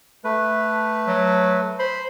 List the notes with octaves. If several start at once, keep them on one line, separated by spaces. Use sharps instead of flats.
A3 B4
F#3
C5 B5